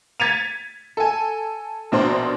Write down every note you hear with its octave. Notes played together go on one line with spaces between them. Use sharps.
G#6 A6 B6 C#7 D#7 F7
A4 G#5
A#1 B2 D4 A#4 C5 C6